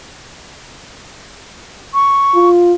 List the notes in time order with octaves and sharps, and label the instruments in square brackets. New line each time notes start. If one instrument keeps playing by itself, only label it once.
[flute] C#6
[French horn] F4